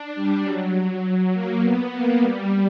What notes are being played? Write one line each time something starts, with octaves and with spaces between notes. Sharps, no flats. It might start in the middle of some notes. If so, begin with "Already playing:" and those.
Already playing: D4
G3
F#3
F#3
A#3
B3
A#3
G3